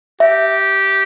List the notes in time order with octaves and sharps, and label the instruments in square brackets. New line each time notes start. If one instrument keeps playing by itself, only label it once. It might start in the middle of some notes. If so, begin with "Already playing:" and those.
[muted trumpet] G4 [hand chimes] E5